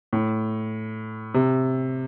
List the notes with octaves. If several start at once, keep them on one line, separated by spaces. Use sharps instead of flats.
A2
C3